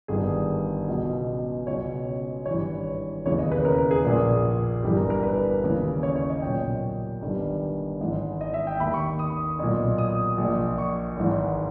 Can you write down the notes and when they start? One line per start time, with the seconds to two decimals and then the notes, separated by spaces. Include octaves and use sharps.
0.08 G1 G2 D#3 G#4
0.88 C#2 B2
1.67 C#2 B2 C#5
2.46 G#1 G2 E3 C#5
3.26 E1 D#2 C#3 E3 C#5
3.39 D#5
3.52 B4
3.65 A#4
3.78 A#4
3.91 G#4
4.04 A#1 A#2 G#4
4.83 G1 G2 E3 G4
4.97 A#4
5.10 A#4
5.23 B4
5.63 D#2 C#3 E3
6.03 C#5
6.16 C#5
6.30 D#5
6.42 B1 A#2 G5
7.21 G1 G2 D#3
8.00 G#1 G#2 E3
8.41 D#5
8.54 E5
8.67 G5
8.80 D#2 B5
8.84 D#3
8.94 C#6
9.19 D#6
9.59 B1 A#2
9.98 D#6
10.38 A#1
10.43 A#2
10.78 C#6
11.17 G#1 G#2 E3